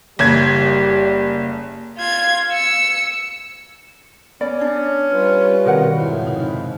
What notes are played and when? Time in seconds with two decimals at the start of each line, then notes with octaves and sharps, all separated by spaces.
0.19 F#1 G3 G#6
1.97 F4 G#6
2.52 E6 C#7
4.41 B3 C#4 D5
4.59 D4 C#5
5.11 G3 F4 B4 F6
5.66 B2 D#3 C4 F#4 A#4 F#5
5.96 F2 G#2 C#3 E4
6.26 C3 D#4